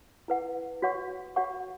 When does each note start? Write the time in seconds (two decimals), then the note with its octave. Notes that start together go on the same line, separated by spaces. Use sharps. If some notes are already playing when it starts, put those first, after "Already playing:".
0.28 E4 B4 F#5
0.82 F#4 C#5 F#5 C#6
1.36 F#4 C#5 F#5 C#6